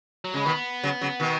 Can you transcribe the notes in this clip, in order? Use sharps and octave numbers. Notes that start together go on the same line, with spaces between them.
F#3
C#3 G#3
B2 D#3 B3
C#3 F#3
C#3 F#3
B2 D#3